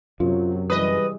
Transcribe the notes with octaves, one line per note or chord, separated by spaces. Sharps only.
F#2 C3 F#3 F4
E3 G3 G#3 B4 D#5 D#6